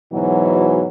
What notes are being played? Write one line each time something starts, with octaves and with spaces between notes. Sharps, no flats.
G#2 B2 E3 F#3